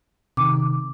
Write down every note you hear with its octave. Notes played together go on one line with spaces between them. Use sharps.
C3 D#3 D6